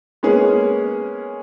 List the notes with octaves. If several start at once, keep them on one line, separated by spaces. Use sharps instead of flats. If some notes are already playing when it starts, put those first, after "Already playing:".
G#3 A#3 B3 C#4 G#4